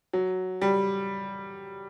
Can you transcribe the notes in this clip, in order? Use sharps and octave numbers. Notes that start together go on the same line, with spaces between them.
F#3
G3